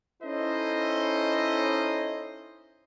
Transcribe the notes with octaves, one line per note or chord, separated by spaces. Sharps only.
C#4 D#4 E4 A4 C5 D#5